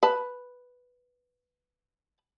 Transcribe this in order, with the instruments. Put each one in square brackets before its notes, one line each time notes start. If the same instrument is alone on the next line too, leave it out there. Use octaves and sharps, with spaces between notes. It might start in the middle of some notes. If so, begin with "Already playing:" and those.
[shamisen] B4 A5